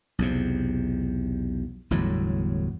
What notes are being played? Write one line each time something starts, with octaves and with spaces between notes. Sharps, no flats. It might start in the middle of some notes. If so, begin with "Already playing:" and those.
B1 E2 C3
G1 E2 A2 F#3